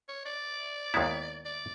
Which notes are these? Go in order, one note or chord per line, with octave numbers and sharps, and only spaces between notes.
C#5
D5
D#2 D#3 G#3 B3 E4
D5